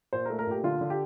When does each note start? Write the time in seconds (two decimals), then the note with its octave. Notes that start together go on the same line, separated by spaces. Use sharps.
0.13 A#2 C5
0.25 A#4
0.30 A3
0.39 A#4
0.47 A#2 G4
0.63 D3 F4
0.81 D3
0.90 G4